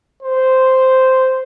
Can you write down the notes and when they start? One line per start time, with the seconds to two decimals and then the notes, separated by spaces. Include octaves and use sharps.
0.22 C5